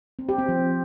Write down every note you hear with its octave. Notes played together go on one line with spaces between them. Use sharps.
C4
G4
C4
F3